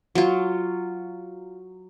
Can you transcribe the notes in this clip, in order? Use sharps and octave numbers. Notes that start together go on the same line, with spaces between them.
F#3 F4